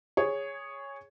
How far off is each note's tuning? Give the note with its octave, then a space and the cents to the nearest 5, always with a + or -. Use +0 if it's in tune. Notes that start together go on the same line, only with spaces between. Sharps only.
G#4 -10 C#5 +0